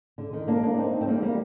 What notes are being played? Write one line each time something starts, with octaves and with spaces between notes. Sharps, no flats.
D3
D#3
A#3 D4
A#3 D4
C4 D#4
C4
G3 A#3
G3 A#3